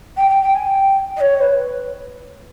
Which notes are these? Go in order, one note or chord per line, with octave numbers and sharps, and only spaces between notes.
G5
G5
G5
G#5
G5
D#5
C#5
B4